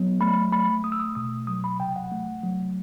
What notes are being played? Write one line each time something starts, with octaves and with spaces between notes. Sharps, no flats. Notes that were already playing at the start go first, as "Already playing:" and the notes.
Already playing: F#3 B3
A3 B5
A3 B5
A3 D#6
E6
D#6
B2 D#6
F#3 D#6
B5
C3 G5
F#5
A3
F#3